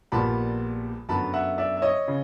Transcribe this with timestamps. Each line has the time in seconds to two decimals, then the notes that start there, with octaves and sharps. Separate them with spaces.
0.12 A#1 A#2 G3 B3 A5 B5
1.09 F#2 D3 F#3 B3 A5 B5
1.34 E5 F#5
1.58 D5 E5
1.77 E5
1.82 C#5 D#5
2.08 C#3